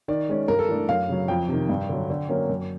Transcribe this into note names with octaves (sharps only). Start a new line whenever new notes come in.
D#3 D5
G#3 C#4
G2 A#4
A4
E3 A3 D4
F#2 F5
C#3 F#3
F2 G5
C3 D#3
G2
D3 F#3
D3
F#3 A#3 C#4
F#2